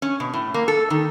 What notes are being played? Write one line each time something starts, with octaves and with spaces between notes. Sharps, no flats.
C#4
B2
A2
A#3
A4
D#3